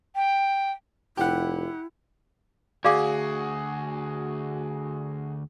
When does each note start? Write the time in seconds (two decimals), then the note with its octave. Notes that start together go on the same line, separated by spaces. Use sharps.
0.15 G5
1.17 F1 E4 G4 F#5
2.84 D2 F#4 G#4 D5 F5 D6